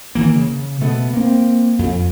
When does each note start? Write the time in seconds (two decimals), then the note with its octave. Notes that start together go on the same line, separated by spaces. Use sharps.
0.15 D#3 E3 A#3
0.35 C#3
0.81 B2 A3 B3
1.13 A#3 C4
1.79 F2